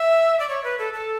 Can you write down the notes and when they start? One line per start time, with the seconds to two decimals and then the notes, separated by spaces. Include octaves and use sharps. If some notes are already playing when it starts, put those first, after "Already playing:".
Already playing: E5
0.40 D5
0.49 C#5
0.64 B4
0.79 A4
0.93 A4